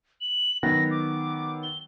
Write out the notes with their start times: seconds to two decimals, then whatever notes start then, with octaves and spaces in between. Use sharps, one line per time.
0.21 F#7
0.63 D#3 F#3 B3 A#6
0.91 D6
1.63 G7